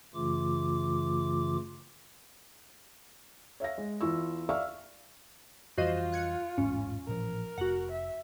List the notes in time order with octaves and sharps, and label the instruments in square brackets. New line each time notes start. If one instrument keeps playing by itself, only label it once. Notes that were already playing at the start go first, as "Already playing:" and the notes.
[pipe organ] F#2 C#3 E3 A3 F4 D6
[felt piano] C#5 E5 F5 A#6
G#3
E2 E4 F4 C#6 E6
D5 E5 F5 C#6 E6 F6
[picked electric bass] F2 E3 G3 [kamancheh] F4 [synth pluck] F#4 C5 D#5
[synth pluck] F#6 G#6 C#7
[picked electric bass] A1 E2 G#2 [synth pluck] C#4
[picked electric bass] A1 A#2 F3 [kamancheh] A#4
[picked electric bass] F1 [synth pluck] F#4 F#5
[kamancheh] E5